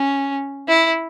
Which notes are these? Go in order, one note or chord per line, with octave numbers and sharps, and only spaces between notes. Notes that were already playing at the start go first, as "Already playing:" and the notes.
Already playing: C#4
E4